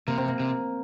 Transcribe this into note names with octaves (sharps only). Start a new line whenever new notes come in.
C3 A#3
C4
A#3
C3